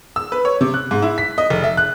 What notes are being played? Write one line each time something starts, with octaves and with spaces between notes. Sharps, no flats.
E6
B4
C#5
C3
F#6
G#2
E4
B6
D#5
F1
E5
F#6